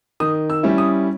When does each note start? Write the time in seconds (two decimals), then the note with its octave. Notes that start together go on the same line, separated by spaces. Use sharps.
0.20 D#3 D#6
0.50 E6
0.63 G3 C#4 E4
0.78 D#6